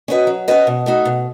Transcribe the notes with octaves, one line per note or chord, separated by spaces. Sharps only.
C#4 F#4 B4 D#5
F#3
C#4 F#4 B4 D#5
B2
A3 D#4 F#4
B2